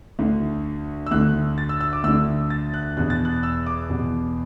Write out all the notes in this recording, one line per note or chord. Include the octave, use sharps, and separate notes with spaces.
D2 D3
E6
D2 D3 F#6
A6
E6
E6
D6
D2 D3 E6
A6
F#6
E2 B2 F#6
A6
F#6
E6
D6
E2 B2